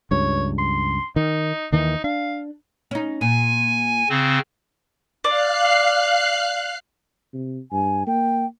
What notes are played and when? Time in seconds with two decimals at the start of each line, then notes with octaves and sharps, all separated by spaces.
0.11 C#2 G2 C#5
0.58 C6
1.16 D#3 D#4
1.72 D#2 D#3 E3 D#4
2.04 D4 F5
2.91 C#4 D#4
3.21 A#2 G#5
4.09 C#3 C4
5.24 D5 F5 F#6 C7
7.34 C3
7.72 G2 G#5
8.07 A#3 G5